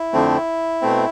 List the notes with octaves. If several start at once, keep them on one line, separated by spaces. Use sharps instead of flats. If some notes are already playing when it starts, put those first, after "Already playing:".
Already playing: E4
F2 D3 F3 A3 C4
B2 A3 C4